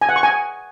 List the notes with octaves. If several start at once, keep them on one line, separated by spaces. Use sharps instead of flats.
G#5
F#5
C#6
G#5